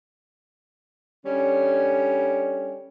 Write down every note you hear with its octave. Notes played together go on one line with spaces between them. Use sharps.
D3 G3 C#4